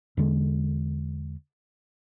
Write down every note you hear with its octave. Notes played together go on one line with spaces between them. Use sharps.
E2 D3 G#3